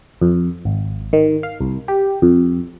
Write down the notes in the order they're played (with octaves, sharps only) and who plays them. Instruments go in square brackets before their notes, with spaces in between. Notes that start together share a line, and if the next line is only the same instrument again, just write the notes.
[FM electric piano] F2
G#1
D#3
F5
C2
G4
F2